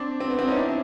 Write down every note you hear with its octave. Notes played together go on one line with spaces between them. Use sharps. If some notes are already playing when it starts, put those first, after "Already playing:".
Already playing: C4 D4
C4
B3
C4
C#4 D#4
D4 E4